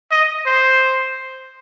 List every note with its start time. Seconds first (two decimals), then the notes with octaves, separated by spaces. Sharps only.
0.11 D#5
0.46 C5